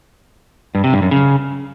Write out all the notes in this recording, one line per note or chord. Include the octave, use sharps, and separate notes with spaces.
G2
C3
G2
F#2
C#3